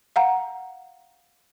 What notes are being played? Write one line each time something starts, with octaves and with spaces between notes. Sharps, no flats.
F5 F#5 A#5